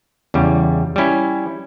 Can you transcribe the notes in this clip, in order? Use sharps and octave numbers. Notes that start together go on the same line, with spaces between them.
E2 C#3 G3
G3 C#4 E4